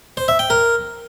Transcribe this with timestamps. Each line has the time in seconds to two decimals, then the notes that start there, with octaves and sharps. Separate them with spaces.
0.17 C5
0.28 E5
0.39 G5
0.50 A#4